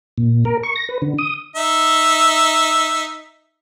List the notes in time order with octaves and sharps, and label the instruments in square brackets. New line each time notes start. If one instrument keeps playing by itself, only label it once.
[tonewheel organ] A#2
A#4
C#6
A#6
B4
D3
D#6
[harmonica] D#4 E5